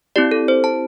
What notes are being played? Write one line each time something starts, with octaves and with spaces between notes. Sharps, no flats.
C4 E4 G4 D5
A4
C5
A5